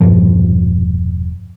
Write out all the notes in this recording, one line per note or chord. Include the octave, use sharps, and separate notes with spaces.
E1 G2 A#2 F3